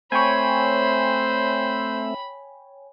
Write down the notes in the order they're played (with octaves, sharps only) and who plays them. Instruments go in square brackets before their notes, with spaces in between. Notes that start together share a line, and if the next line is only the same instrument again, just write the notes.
[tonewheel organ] A3 C4 E5 [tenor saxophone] C5 [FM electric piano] C#5 G5 G#5 [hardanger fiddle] B5